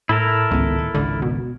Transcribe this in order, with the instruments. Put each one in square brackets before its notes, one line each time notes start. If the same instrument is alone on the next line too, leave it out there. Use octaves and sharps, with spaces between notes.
[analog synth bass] A2 [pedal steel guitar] E4 A4 A#4
[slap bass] G#1 D#3 B3 [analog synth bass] C#2
[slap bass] A2 D#3
[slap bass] G#1 C#2 D#3 [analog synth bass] D3
[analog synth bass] B2